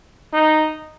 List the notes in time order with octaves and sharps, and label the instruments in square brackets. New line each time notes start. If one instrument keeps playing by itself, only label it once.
[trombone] D#4